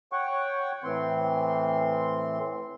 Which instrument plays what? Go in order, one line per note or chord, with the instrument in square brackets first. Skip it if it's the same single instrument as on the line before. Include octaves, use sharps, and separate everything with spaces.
[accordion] C#5 F#5 G5 C#6
A2 E3 C4 C6